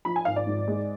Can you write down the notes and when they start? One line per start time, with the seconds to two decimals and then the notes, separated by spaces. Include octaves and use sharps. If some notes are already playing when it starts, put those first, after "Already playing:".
0.05 F3 B5
0.16 G#5
0.25 G#1 F5
0.36 D5
0.46 G#2
0.68 G#3